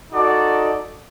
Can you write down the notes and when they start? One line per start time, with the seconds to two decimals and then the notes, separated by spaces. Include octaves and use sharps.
0.13 D#4 F#4 A4 D5